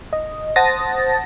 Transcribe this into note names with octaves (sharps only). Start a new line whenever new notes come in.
D#5
C5 F#5 A5 D#6 A6 A#6